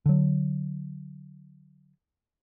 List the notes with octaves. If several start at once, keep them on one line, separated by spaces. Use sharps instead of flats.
D3 F#3